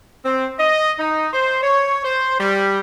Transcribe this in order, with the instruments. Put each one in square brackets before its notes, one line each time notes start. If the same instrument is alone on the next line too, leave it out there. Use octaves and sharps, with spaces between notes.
[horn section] C4
D#5
D#4
C5
C#5
C5
G3